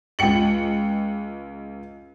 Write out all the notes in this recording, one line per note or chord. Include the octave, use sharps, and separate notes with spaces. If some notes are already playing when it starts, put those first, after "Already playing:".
C#2 F4 G5 C#7 F#7